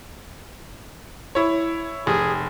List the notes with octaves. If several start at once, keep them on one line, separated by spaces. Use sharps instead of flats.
E4 C#5
F1 G#4